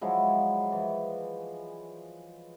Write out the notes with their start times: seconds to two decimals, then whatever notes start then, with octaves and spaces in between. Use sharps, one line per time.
0.01 F3 F#3 G#3 E4
0.72 E3 F3